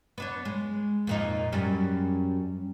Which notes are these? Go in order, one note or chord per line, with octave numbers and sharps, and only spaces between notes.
B3 D4 C#5
G#3
F2 A#2 D#4
F#2 G3 C#4